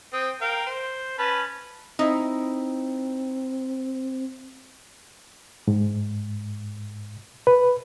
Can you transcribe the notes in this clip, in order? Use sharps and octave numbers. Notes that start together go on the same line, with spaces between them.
C4 D#6
A#4 F5 G5
C5
C#4 B4 A5
C4 D#4 E4
G#2
B4